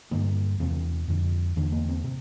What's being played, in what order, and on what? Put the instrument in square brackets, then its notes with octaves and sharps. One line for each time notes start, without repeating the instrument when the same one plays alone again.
[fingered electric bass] G2 D3 A#3
E2 C3 C4
F2 D3
E2 D3
A#3
C4
C3 C4